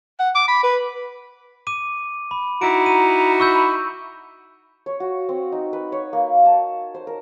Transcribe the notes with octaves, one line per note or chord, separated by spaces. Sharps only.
F#5
D6
B5
B4
D6 D#7
B5
D#4 E4 F#4 A#5 D7
D#7
B5 C#6 E6 G6
C#5
F#4
C4
D#4
B4
C#5
A#3
A5
C5
A#4